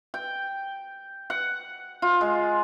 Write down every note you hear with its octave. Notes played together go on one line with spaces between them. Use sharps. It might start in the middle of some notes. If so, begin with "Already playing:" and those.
G5
F#5
F4
G#3